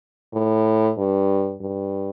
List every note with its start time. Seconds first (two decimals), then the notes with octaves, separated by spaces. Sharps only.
0.33 A2
0.98 G2
1.61 G2